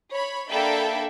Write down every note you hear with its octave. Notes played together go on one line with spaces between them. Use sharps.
C#5 B5
A#3 D4 A4 E5 G5 B5